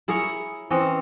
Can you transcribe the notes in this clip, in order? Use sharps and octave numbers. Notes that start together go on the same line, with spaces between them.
E4 G#4 A#4 C#5
E3 C4 C#4 D#5